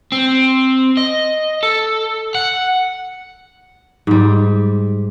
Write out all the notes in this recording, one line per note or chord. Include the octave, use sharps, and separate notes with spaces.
C4
D#5
A4
F#5
G#2 G3